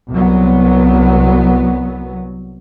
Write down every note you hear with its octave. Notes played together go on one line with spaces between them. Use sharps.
C2 F#3 B3